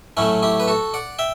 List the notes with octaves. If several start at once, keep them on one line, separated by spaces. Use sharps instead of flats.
A2 F#3 A3 C#4 E4
E4 G4
B4
F#4 A4
D5 F#5
E5 G5